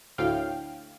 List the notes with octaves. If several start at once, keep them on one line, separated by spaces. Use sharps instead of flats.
D2 A2 F5 G5 F6